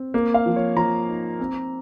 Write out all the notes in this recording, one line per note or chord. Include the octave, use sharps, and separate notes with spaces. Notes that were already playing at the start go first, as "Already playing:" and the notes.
Already playing: C4
A#3
F5
F3
C#5
F3 A#5
D#4
C4